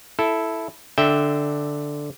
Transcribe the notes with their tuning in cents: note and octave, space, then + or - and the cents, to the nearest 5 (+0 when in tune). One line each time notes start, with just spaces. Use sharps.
E4 +0 A4 -5
D3 +0 E5 -10 G5 +0